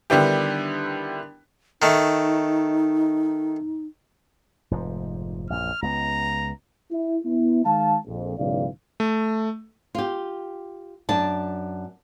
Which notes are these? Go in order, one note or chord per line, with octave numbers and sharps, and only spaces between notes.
D3 D#3 G3 B3 E4 G4
D#3 A3 D#4
F1 G#2 F3
A#1 F#2 F6
C#2 B3 A#5
E4
B3 E4
D#3 G#3 F5 A5
A#1 F2
B1 G#2 C#3 E3 D5 F5
A3
F4 G4
F#2 D4 A5